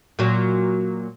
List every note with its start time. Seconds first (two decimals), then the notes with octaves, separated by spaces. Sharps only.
0.19 A#2 F#3